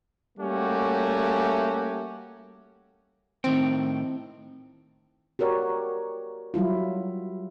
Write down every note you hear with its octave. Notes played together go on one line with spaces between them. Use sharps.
G3 A3 A#3 C#4 F#4 G4
A2 D#3 C4 G5
F#4 G4 A#4 C#5 D5
F#3 G3 E4 F4